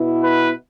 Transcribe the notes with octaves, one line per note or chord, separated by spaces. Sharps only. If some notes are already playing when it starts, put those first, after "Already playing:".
Already playing: B2 B3 E4
B4